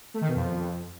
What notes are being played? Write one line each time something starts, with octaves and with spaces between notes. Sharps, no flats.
A3
D#3
B2
F2